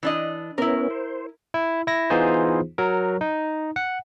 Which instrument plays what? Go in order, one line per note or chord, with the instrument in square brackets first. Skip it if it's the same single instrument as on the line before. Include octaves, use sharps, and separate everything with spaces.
[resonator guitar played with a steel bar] E3 D4 D#5
[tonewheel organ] B3 C#4 [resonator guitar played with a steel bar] E4 A#4
[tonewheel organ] C5
[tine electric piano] E4
E4 A#6
E3 B3 D#4 F4 G#4 C5
F#3 A#4
D#4
F#5